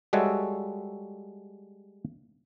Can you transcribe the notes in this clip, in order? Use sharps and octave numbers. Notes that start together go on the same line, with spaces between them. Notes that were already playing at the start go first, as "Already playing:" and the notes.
G3 G#3 F#4 A4 C#5 E5